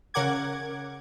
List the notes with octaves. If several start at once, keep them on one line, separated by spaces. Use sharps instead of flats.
C#3 C#4 A#4 F#5 D6 G#6